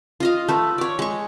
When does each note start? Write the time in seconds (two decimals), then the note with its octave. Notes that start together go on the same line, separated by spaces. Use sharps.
0.20 F4 D#5 F5
0.48 A3 B4
0.78 C#5 D5
0.99 G#3 C#6